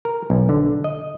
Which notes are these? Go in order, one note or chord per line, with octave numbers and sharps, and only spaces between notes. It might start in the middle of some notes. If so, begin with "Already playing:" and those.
A#4
B1
D3
D#5